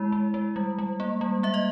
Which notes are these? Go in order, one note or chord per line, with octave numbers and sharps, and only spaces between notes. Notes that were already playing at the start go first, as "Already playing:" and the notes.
Already playing: G#3 E4
G#3
G#3
G3
G3
A#3
G3
A#3 E5
D#5